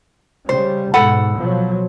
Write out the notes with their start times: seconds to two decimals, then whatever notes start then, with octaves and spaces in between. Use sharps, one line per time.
0.49 C#3 G3 C5
0.94 G#2 B2 A4 F#5 B5
1.37 B2 F3 F#3